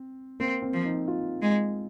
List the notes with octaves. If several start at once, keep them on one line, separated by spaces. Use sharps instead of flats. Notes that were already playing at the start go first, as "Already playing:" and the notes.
Already playing: C4
A#3 C4
C4
F3
D#4
F4
G#3